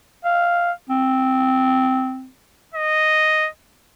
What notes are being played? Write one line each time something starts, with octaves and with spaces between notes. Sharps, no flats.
F5
C4
D#5